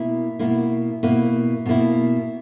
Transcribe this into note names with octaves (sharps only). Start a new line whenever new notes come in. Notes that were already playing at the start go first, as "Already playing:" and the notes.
Already playing: B2 A#3 E4
B2 A#3 E4
B2 A#3 E4
B2 A#3 E4